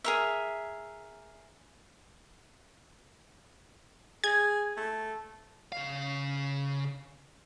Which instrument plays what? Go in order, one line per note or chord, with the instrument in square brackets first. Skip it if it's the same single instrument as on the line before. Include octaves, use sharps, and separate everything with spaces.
[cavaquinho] G#4 A#4 E5
[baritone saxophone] G#4 [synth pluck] G#6
[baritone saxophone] A3
[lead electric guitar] C#3 F5